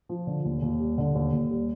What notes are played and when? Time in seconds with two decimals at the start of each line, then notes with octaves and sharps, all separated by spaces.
0.09 F3
0.27 D3
0.45 D#2
0.62 D#2
0.80 G3
0.98 D3
1.15 D#2
1.32 D#2
1.51 G3